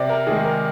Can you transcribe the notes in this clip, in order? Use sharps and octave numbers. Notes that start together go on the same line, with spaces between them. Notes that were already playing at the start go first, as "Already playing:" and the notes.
Already playing: C3 D5
A#4
D#3 G#3 G#4
A#4